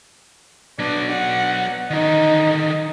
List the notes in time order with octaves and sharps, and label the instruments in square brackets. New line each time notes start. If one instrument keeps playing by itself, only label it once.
[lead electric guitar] F#3 B3 [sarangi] D4
[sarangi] F#5
[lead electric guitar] D3 D#3 [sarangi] D#4